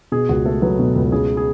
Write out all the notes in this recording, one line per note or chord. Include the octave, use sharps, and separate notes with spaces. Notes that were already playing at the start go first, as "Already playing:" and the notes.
B2 G#4
C#2 F#4
A3 A4
F#3 B4
B2
C#2
C#3 G#4
G#4